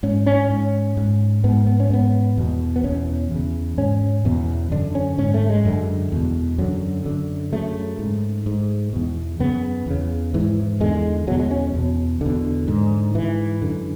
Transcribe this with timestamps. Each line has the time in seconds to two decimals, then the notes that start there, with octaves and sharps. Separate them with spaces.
0.03 G#2 C#4
0.26 C#4
0.50 G#2
0.97 G#2
1.44 G#2 B3
1.67 B3
1.80 C#4
1.90 G#2 B3
2.37 E2 B2
2.76 B3
2.84 E2 B2 C#4
3.31 E2 C#3
3.78 G#2 C#4
4.25 E2 B2
4.71 F#2 D3 D4
4.95 C#4
5.18 G#2 C#4
5.34 A3
5.50 G#3
5.65 F#2 D3
6.12 E2 B2
6.58 F#2 D3 F#3
7.06 F#2 D3
7.53 F#2 C#3 A3
7.99 G#2
8.46 G#2
8.93 E2 B2
9.40 F#2 C#3 B3
9.86 E2 C#3
10.34 G#2 E3
10.80 E2 D3 G#3
11.27 E2 B2 F#3
11.39 G#3
11.51 C#4
11.74 E2 B2
12.21 E2 B2 D3
12.68 G#2
13.14 G#2 E3
13.62 F#2 D3